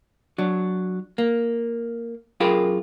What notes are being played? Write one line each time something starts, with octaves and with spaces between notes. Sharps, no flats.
F#3 D4
A#3
F#2 F4 G#4 A#4 G5 B5